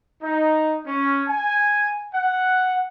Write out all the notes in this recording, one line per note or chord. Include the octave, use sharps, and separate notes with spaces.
D#4
C#4
G#5
F#5